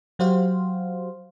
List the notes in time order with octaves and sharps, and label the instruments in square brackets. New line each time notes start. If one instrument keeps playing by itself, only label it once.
[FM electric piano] F#3 F#4 G4 C5 F5